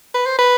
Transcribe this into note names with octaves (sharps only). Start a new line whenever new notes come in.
B4
C5
B4